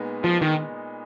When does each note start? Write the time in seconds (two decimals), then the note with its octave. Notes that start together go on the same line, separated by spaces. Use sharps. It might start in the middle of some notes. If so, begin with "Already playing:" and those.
Already playing: A#2 G#3 B3 D#4
0.24 F3
0.41 D#3